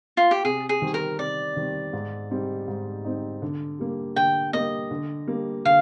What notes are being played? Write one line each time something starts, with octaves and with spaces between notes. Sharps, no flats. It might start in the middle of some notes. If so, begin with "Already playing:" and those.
F4
G4
C3 G#4
G#4
D#3 G3 C4
A#4
C3 D5
D#3 G3 C4
G#2
G3 C4 D#4
G#2
G3 C4 D#4
D3
G3 A#3
D3 G5
G3 A#3 D#5
D3
G3 A#3
D3 F5